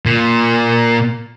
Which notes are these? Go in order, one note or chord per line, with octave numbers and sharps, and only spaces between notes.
A#2